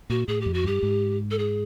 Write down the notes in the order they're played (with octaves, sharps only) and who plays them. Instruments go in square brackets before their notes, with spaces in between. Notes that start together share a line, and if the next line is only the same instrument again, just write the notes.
[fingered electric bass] A#2 [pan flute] F#4
[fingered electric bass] A2 [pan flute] G#4
[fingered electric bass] F2 [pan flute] G4
[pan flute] F#4
[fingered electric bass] G2 [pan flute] G4
[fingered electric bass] G#2
[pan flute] A4
G#4